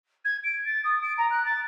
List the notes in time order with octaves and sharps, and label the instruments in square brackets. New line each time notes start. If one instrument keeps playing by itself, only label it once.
[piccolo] G#6
D7
A6
D#6
D7
A#5
F#6
A6